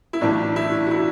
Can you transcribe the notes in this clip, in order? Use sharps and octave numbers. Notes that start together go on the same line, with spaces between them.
E4
B1 A2 E3 D4
E4
F#4
E4